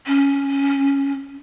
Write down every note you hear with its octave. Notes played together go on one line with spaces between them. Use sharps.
C#4